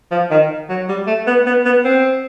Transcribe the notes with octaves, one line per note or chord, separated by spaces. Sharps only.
F3
D#3
F#3
G3
A3
B3
B3
B3
C4